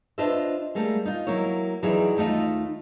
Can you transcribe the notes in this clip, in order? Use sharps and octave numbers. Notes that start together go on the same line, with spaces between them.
D4 F4 B4 C5 D#5 E5
G3 A3 A#3 G#4
D#4 F4
F#3 A#3 E4 C#5
E3 F#3 D#4 E4 G#4 D5
D#2 A3 D#4 F4